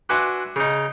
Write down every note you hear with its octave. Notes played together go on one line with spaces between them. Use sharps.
D4 F#4 B4 E5 G#5 C6
C#3 D#4